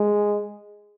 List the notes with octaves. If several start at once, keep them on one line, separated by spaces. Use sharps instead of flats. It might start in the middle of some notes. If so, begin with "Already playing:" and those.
Already playing: G#3